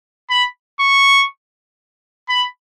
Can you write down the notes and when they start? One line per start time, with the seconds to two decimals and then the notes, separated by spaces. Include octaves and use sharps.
0.30 B5
0.80 C#6
2.29 B5